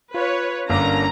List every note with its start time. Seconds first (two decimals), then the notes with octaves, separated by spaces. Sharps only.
0.14 F4 B4 C#5
0.70 G1 A#3 C#4 D4 A#5